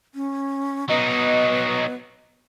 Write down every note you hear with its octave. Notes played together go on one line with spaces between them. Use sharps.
C#4
F#3 B3 D#4 D#5